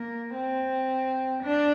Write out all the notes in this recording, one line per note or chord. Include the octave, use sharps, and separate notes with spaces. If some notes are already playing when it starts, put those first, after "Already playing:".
Already playing: A#3
C4
D4